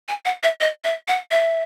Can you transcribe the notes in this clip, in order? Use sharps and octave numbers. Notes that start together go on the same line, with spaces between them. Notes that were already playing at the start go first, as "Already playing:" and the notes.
G#5
F#5
E5
D#5
E5
F#5
E5